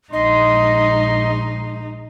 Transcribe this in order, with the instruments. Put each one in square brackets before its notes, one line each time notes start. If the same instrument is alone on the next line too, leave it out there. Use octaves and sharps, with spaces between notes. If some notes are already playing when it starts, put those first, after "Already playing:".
[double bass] A#1 [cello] G#3 D#4 [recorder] D#5 [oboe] C6